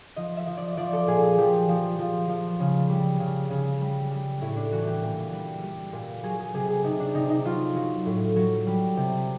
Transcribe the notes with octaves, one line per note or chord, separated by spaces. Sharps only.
F3 D#5
E5
F3
D5
F3 D5
A4
A#2 G#4
G#4
F3 G4
F3
F3
F3
C#3
G3
C#3
C#3
G3
G3
A2 E4
D4
E3 F#4
G4
A#2
G3
G3
A#2
F#3 G#4
G#4
C3 G#4
G#4
C3 D#4
D4
C3 D#4
D#4
F#3 F4
F#3
A2
F#3
G3
C3